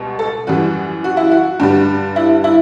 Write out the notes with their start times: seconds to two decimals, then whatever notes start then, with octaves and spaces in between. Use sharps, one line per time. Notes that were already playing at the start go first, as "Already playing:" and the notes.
Already playing: C#2 B2 G3
0.19 A4
0.47 F#2 E3 G3 F#4
1.04 F#4
1.17 E4
1.32 F#4
1.60 G2 D3 G3
2.16 E4
2.44 E4